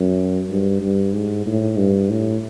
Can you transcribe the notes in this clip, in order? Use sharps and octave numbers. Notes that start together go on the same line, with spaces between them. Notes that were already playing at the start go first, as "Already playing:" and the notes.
Already playing: F#2
G2
G2
G#2
A2
G2
A2